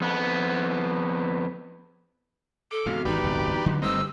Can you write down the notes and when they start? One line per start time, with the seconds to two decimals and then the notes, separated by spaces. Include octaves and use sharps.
0.01 F2 B3
2.71 A4 D6
2.86 G#2 C3 E3 B3 F#4 F5
3.05 G#1 E2 D#4 G4 B4 D5
3.24 D1 G1 C2
3.66 D3 F3 F#3 G4 B4 D#5
3.82 G1 G3 A3 C4 D#4 E6